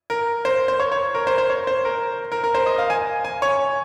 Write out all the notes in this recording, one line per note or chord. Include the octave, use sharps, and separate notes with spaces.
A#4
C5
C5
C#5
C#5
A#4
C5
C5
C#5
C5
A#4
A#4
A#4
C5
D#5
F5
G#5
G#5
C#5